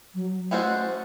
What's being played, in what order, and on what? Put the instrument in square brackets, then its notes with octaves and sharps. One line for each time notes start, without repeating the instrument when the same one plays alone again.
[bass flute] F#3
[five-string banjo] G#3 C#4 F#4 A4 C5 [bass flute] A3